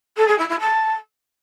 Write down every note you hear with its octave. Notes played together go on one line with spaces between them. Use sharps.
A4
G#4
E4
E4
A5